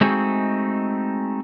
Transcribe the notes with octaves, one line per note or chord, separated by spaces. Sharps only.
G#3 A3 C4 D#4 F#4 G#4